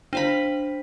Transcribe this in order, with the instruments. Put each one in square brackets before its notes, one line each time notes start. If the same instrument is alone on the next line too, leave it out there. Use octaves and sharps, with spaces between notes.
[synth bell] D4 [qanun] C5 F5 B5